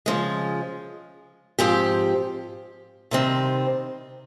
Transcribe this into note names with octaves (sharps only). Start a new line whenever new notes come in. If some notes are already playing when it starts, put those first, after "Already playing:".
C#3 F3 G#3
G#2 F3 C4 G4
C3 D#3 G3 C4 D#4